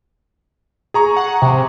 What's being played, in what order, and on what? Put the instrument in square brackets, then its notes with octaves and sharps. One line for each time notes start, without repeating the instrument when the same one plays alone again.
[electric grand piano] G#4 A#5 C#6
[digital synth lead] F#5
C3